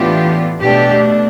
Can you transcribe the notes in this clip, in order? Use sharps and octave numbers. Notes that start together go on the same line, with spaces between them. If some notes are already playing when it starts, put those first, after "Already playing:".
Already playing: A2 E3 B3 D4 F4 G4
B2 A3 D4 G4